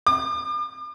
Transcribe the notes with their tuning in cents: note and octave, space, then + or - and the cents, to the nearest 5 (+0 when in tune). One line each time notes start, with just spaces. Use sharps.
D6 +45